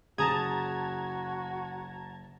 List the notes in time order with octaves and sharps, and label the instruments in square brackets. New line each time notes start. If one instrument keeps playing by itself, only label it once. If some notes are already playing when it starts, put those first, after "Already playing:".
[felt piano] F#1 C#3 C5 [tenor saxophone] F#4 [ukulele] G#4 [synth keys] A5 A#5 G#6